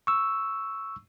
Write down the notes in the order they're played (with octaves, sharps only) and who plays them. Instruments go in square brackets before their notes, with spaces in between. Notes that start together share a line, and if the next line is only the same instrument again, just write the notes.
[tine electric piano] C#6 E6